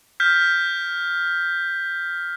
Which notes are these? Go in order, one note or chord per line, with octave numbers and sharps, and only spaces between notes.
F6 G6 B6